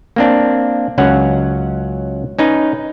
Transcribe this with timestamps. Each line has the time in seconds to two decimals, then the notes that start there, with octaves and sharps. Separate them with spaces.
0.16 A#3 C4 D4
0.98 C#2 F#3 C#4 F#5
2.39 C#4 D#4 B4